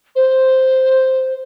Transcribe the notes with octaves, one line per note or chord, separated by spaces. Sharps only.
C5